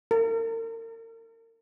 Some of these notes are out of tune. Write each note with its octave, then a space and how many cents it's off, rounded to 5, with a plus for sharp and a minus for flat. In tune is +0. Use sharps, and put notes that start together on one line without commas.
A#4 -40